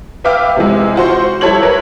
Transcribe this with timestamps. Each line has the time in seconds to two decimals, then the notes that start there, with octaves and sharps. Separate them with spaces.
0.24 B4 E5 F5 G5 D6 F6
0.56 C3 E3 G#3
0.96 F4 F#4 C5
1.41 G3 E4 A4 C#5 G#6 F#7
1.63 A#4 B4 C#5